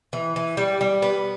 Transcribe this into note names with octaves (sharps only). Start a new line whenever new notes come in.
E3
E3
G3
G3
B3